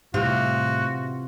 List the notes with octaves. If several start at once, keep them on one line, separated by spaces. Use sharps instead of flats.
A2 C3 E3 G3 C4 F4 F#4